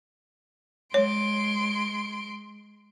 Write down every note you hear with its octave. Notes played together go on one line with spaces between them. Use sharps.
G#3 C#5 C6 D7